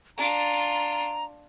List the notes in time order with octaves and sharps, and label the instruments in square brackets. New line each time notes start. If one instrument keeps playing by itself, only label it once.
[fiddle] D4 F4 [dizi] A#5